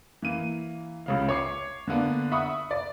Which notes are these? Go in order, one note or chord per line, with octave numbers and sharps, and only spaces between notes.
E3 A#3 D#7
C#2 C#3 F5
C#5 D6 C7
D3 A#3 B3 D4
E5 F#5 B5 C#6 D#6
D5